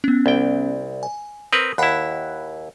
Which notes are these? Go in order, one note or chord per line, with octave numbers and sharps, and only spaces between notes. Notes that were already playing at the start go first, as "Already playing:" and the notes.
B3 C#4
C2 G5
G#5
C4 A#4 B4 D#6
D#2 E4 F#5 B5 F#6